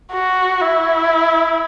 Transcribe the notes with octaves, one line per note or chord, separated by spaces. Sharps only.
F#4
E4